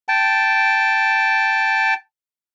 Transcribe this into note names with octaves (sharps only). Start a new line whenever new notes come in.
G5 A5